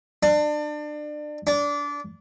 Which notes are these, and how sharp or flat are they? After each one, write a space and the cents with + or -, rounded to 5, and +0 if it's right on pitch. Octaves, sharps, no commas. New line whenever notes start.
D4 +30
D4 -20